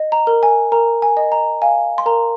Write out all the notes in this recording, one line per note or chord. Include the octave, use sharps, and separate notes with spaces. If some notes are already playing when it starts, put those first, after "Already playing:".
Already playing: D#5
A#5
A#4
G#5
A#4 A#5
G#5
D#5
A#5
F5 G#5
C6
A#4 A#5